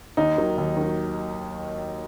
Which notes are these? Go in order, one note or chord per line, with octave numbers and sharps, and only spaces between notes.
D#2 D#4
D#3 F#3
D#2
D#3 F#3